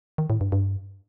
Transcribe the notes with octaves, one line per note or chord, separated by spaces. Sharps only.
D#3
A2
G2
G2